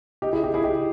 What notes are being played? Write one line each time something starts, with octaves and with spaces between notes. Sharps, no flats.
D#4 G4
E4 G#4
D#4 G4
E4 G#4
D#4 G4